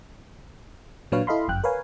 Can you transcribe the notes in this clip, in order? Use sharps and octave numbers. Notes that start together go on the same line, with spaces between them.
A#2 F#3 D4 B4 C#5 F5
E4 A4 D#5 F5 B5 C6
G1 F#2 G5 F#6
A#4 B4 C#5 F5 G#5